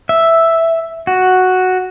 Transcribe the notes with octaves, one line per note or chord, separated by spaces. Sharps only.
E5
F#4